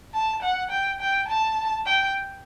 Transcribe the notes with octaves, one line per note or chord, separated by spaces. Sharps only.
A5
F#5
G5
G5
A5
G5